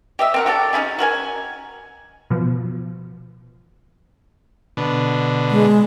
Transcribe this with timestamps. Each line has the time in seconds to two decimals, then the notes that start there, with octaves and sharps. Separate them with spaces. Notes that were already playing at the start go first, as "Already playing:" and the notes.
0.19 G4 D#5 E5
0.34 C4 A#4 F#5
0.46 F#4 G4 A4 D5
0.73 C#4 D#4 E4 G#4
0.99 F#4 A#4 C#5 G#5
2.30 B2 F3
4.77 B2 D3
5.51 G#3